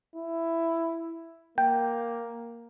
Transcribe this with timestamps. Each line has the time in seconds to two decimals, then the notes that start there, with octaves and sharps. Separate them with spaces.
0.15 E4
1.58 A#3 G5